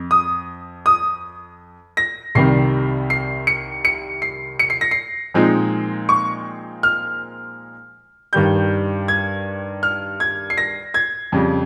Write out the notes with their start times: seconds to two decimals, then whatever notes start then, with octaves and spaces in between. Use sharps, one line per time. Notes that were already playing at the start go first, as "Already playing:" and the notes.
Already playing: F2
0.11 D#6
0.86 D#6
1.97 A#6
2.35 C2 C3 D#3 G3 C7
3.10 C7
3.47 C#7
3.85 C#7
4.22 C7
4.59 C#7
4.70 C7
4.81 A#6
4.91 C7
5.34 A#2 F3 G#3 C4 D#4
6.09 C#6
6.83 F6
8.33 G2 D#3 G3 G6
9.08 G#6
9.83 F6
10.20 G#6
10.50 C7
10.58 A#6
10.94 G#6
11.32 F2 C#3 G3